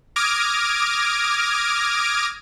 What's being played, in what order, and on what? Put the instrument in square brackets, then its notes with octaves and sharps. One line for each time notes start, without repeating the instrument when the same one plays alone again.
[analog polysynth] D6 D#6 F6 G#6 A#6 D7